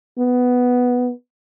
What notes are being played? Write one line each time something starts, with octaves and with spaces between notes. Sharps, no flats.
B3